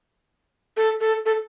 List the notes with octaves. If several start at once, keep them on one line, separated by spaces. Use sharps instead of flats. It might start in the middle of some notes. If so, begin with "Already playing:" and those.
A4
A4
A4